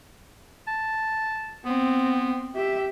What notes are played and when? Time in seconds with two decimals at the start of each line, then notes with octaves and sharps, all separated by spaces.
0.67 A5
1.65 B3 C4
2.56 G4 E5